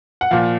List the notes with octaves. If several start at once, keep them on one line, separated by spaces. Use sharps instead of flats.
F#5
A#2 F3 F5